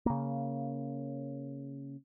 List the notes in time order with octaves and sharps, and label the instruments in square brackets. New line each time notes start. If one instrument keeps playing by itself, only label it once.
[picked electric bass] C#3 A#3